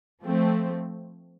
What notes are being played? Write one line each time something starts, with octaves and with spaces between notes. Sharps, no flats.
F3 A3 C4